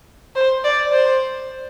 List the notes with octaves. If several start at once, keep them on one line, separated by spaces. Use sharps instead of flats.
C5
D5
C5